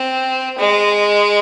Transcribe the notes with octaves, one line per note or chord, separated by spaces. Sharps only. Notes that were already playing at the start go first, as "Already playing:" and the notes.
Already playing: C4
G#3